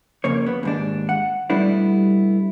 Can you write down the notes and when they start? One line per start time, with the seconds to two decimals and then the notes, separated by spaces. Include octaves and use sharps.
0.24 F2 C#3 A#3 C#5
0.47 B3
0.63 D#2 G#2 D4
1.09 F#5
1.50 B2 G3 A3 B3 D4 E4